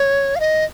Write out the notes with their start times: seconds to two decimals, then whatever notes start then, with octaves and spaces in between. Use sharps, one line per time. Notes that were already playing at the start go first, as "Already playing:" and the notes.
Already playing: C#5
0.36 F5
0.40 D#5